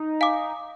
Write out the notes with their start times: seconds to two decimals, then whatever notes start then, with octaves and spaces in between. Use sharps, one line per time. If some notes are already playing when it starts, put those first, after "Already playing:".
Already playing: D#4
0.21 F5 G#5 D6